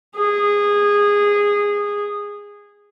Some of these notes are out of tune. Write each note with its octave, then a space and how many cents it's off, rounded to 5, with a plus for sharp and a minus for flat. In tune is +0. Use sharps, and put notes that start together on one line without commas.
G#4 -15